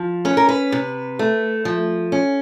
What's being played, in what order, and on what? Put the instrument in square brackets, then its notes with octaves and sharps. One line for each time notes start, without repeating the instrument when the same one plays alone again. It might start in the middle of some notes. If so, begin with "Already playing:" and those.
Already playing: [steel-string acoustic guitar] F3
C#4 B4
A#4
B4
C3
A3
F3
C#4